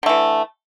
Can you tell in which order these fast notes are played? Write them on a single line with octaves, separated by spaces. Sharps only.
D3 A3 E3